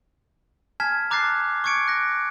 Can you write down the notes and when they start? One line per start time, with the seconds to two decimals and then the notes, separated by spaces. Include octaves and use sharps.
0.80 G#5 A5 F6 G#6 B6
1.11 A#5 D6 F#6 A6 C7
1.64 C#6 D6 G#6 C#7 D7
1.88 F#6 A#6